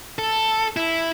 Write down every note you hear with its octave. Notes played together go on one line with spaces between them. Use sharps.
A4
E4